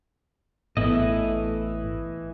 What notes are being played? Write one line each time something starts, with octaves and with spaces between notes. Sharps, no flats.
A1 A2 E3 A3 B3 E4 D#5